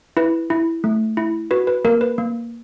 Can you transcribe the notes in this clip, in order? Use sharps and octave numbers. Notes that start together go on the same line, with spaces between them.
E4 B4
E4
A3
E4
F#4 B4
B4
A#3 A#4
B4
A#3